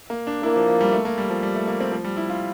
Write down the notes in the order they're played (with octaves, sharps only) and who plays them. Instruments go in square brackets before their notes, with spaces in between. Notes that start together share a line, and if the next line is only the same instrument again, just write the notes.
[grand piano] A#3
D4
[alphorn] A#3 [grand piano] E4
[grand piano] F3
F3
G3
A3
A#3
G3
F3
G3
A3
A#3
C4
F3
G3
E4
F4